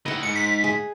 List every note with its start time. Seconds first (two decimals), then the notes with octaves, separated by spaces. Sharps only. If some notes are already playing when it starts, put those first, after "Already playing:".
0.06 D#3 E4 D#5 F#5
0.23 G#2 C#7
0.36 B6
0.64 G#4